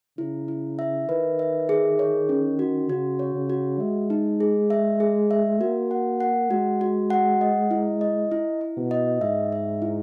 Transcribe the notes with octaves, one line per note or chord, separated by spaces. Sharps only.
C#3 E4
E4
E5
D#3 B4
E5
G#4
C#5
C#4
F#4
C#3 F#4
C#5
C#3
F#4
G#3 E5
D#4
G#4
E5
G#4
E5
A#3 F#4
F#5
F#5
G#3 F#4
F#4
F#5
D#5
E4
D#5
E4
E4
B2
D#5
G#2 E5
E5
E4